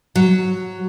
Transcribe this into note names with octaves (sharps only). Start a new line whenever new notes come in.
F#3